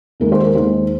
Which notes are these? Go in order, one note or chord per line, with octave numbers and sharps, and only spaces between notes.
D#2 D#3 G#3 A#4
C5
A#4
D#2 D#3 G#3 C5